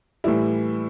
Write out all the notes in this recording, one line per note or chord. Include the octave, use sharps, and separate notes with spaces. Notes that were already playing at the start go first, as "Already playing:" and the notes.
A2 E3 G3 E4